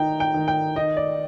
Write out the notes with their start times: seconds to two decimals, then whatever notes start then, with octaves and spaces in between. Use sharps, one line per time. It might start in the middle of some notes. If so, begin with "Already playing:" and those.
Already playing: D#3 D#4 G5 A#5
0.20 G5
0.34 D#3
0.48 G5
0.76 D#4 D#5
0.97 D5